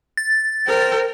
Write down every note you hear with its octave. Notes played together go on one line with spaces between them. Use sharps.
A6
A#4 C5 G5